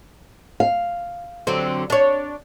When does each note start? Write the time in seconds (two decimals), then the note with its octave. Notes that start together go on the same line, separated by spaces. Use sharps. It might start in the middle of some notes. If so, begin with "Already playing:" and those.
0.60 F5
1.47 D3 F#3 C4
1.90 D4 C#5